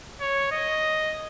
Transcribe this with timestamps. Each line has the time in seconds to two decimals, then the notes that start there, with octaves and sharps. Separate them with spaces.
0.21 C#5
0.52 D#5